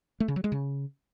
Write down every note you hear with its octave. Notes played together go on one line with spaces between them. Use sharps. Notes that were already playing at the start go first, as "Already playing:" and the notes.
A3
C#3
F#3
G#3
C#3